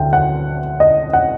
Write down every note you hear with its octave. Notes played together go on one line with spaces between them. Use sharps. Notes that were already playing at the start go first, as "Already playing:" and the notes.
Already playing: D2 D3 G5
F#5
D#5
F#5